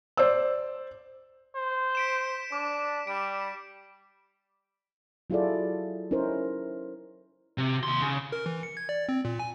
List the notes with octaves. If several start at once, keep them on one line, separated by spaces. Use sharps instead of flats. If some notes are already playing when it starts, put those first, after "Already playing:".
C5 D5 E6
C5
B6 D7 E7
D4 D6
G3 D7
F#3 E4 F4 G#4 A4 D5
C#4 D#4 E4 A#4 C5
C3
D#2 C6
C#3
A#4
E3
C#7
G#6
D5
C4
A#2
G#5